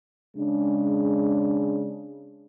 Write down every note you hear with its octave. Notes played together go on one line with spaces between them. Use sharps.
C#3 G#3 D4